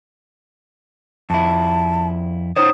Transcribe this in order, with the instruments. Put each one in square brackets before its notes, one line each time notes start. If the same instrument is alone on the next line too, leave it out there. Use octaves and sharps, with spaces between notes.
[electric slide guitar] F2 E4 [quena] A5
[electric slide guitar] D#4 C5 C#5 [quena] D#6